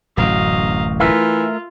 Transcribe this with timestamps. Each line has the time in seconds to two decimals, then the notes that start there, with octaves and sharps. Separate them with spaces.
0.17 D1 A1 F#2 F#3 D#5 F5
1.00 E3 A3 F4 A#4 E5